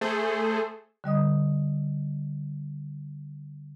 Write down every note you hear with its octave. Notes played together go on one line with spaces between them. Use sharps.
A3 G#4 A4 C5
D3 G3 D#5 D#6